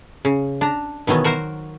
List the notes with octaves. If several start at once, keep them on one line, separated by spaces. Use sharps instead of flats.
C#3
D4 A#5
B2 D#3 E3 F#3 B3
F#4 A#4 C5